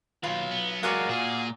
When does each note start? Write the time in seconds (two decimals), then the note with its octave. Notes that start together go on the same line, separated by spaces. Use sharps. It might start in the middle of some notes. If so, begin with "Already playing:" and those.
0.24 D#2 F#3 F4 B4
0.51 B3
0.83 F#3 G#3 F#4 A#4 D5 F5 F#5 G#5
1.10 A#2 G#4 F5 G#5